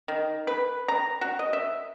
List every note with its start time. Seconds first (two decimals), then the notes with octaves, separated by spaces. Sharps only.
0.08 D#3
0.47 B4
0.88 A#5
1.21 F#4
1.39 D#5
1.53 E5